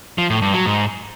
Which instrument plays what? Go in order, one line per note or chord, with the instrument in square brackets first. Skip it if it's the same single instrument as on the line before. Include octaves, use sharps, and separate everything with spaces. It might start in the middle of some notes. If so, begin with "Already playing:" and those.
[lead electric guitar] F3
A2
G2
F#3
G#2